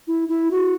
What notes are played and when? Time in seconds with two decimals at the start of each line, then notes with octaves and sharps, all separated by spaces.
0.07 E4
0.28 E4
0.51 F#4